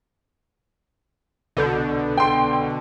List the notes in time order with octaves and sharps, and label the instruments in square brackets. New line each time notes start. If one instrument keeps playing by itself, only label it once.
[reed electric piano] C2 A4 G6 [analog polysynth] B2 D3
[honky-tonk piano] G5 C6